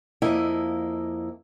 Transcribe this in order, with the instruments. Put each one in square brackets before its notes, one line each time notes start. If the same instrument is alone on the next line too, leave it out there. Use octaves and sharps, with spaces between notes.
[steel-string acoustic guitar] F2 A#3 E4 D#5